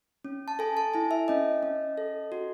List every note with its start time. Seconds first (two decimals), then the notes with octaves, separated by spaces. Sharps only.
0.25 C#4
0.48 A5
0.59 A4 G#5
0.77 A5
0.94 E4 G#5
1.11 E5
1.28 C#4 D#5
1.63 C#4
1.98 A4
2.32 F#4